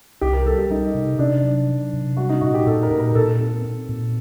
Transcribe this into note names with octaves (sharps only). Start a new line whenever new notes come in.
C2 G4
A#4
G3 A4
G4
G3 D#4
C3
C3 D4
F#3
F#3
C3
G3 F#4
D#4
A#2 F#4
G4
A#2 A4
A#4
A#2
A#4
A#2 A4
C4
C4
A#2